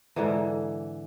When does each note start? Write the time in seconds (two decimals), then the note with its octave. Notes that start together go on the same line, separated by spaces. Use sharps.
0.16 G#2 D3 E3